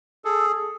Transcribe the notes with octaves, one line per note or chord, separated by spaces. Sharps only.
G#4 A4